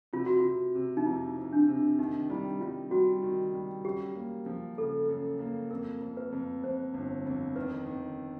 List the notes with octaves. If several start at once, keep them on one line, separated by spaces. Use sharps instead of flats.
C3 F4
F#4
C3 F4
C3
D#4
F2 E4
F2
D4
C3
D#3 D#4
G3 E4
G3 F4
G3 F#4
D#3
G3
F#2 G4
A#3
F3
C#3 A4
F#2
A#3
F2 A#4
F2
B4
F2
F2 C5
G1
F2
D#3 B4
D#3